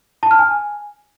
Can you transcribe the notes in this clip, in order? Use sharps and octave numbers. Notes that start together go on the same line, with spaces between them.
A5
F6
G#5